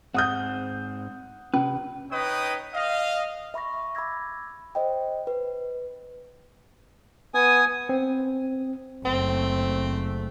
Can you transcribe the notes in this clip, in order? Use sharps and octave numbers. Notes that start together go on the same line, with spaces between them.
G#2 C4 F#5 D#6 G6
C3 C#4 B4
D#4 B4 C#5 D#5 G5 D#6
D#5 F5
E5 B5 C#6 A#6
B5 D6 E6 G#6 A#6
C5 D#5 G5
B4
B3 G#5 D#6
C4
F#1 A3 C4